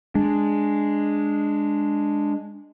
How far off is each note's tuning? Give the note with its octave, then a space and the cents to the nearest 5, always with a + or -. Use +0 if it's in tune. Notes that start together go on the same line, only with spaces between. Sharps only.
G#3 +0 D4 +0